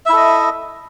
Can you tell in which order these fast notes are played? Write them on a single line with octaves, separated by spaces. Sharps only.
E5 E4 A4 D#5